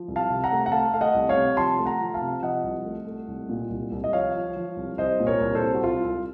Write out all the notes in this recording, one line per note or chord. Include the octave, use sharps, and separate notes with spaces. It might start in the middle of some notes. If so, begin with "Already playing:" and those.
Already playing: F3
C2
F5 A5
C3
F#5 A#5
A3
F#5
A3 F5 A5
A3 F5
D#5 F#5
C2
C#5 F5
C3
F3 A5 C6
A3
F#5 A#5
F3
F5 A5
C3
F3 D#5 F#5
C2
A3
A3
C2
A#2
C2
C2
D#5
F3 C#5 F5
F3
F3
C2
C2 C5 D#5
A#2
A#4 C#5
C2
A4 C5
C2
F#4
C2 F4
C2